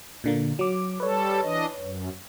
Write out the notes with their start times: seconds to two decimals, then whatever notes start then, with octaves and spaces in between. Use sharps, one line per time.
0.24 A#2 D3 A#3
0.59 F#3 D6
1.00 G3 A4 B4 C#5
1.42 E3 D4 D#5
1.80 F#2